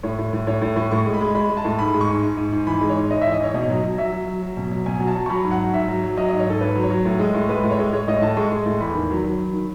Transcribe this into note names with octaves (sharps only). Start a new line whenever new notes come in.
A2 C#5
A2
A2
A2 C#5
A2
A2
A2 C#6
G#3
B5
G#3
G#3 B5
G#3
A5
A2
G#2 B5
G#3
C#6
G#2
G#2
G#2
G#2
E3 B5
G#3
C#5
G#2
G#2 D#5
E3 E5
D#5
G#2 C#5
B2 D#5
F#3
F#3
F#3 E5
F#3
F#3
F#3
B2
F#3
B2 G#5
F#3
A5
F#3
C#6
F#3 B5
G#2
F#5
F#3
G#2 E5
F#3
F#3
F#3 D#5
G#2 D#5
C#5
G#2 A4
G#2 B4
F#3
C#5
F#3
A2
G#3
A2
G#3 B4
A2
C#5
G#3
G#3 C#5
A2 D#5
A2 A5
G#3 C#6
G#3
A2
E2 B5
D#3
F#3
F#3
D#3
D#3